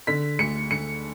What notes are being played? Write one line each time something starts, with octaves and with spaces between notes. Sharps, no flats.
D3 B6
D2 C#7
D2 C#7